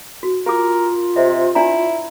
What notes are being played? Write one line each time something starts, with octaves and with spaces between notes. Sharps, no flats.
F#4
F4 G4 A#4 D6
C3 C5 D#5 E5
D4 E4 D5 A#5